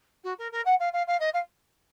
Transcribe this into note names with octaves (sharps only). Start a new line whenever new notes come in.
F#4
A#4
A#4
F#5
F5
F5
F5
D#5
F5